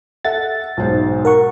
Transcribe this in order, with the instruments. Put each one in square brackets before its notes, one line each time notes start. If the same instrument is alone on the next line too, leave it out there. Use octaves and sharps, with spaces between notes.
[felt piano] A4 E5 F#5 [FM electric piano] A6
[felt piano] B1 G#2 C5
[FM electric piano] A#4 F#5 C#6